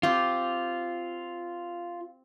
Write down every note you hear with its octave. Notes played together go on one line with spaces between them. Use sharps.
C4 F4 G4